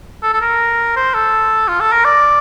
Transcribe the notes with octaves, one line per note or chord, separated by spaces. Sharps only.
A4
A4
A#4
C5
A4
F4
A4
A#4
D5